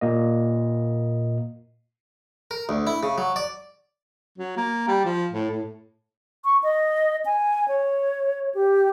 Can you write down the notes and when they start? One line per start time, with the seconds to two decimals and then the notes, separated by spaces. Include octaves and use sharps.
0.01 A#2 A#3 D#5
2.51 A#4
2.69 D2
2.87 E4
3.03 C#3
3.18 F#3
3.36 D5
4.38 F#3
4.57 A#3
4.88 G3
5.05 F3
5.32 A2
5.50 A2
6.45 C#6
6.63 D#5
7.26 G#5
7.68 C#5
8.55 G4